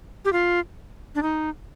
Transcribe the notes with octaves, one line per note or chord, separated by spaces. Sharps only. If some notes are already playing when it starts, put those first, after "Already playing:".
G4
F4
D4
D#4